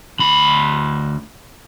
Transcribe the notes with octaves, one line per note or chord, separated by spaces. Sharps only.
D2 B5